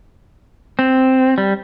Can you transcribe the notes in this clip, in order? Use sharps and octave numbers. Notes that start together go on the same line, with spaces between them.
C4
G3